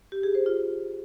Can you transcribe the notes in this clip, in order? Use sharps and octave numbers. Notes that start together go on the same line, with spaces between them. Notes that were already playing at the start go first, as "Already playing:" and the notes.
G4
G#4
C5
F4